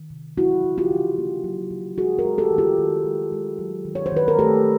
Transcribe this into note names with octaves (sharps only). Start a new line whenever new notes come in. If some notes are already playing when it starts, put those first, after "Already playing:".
Already playing: D#3
C3
F#3 E4 F#4
C#3
F4 G4
C#3
A#3
F#3
C#3
G#3 F#4 G#4
G#4 A#4
G#3
G4 A4
D#3
F4 G4
D#3
G#3
G#3
F#3
D#3
C#5
C5
D#3 B4
A#4
A3 G4 A4